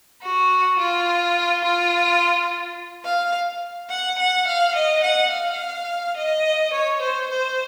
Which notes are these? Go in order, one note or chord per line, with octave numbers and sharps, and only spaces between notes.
F#4
F4
F4
F5
F#5
F#5
F5
D#5
F#5
F5
D#5
C#5
C5
C5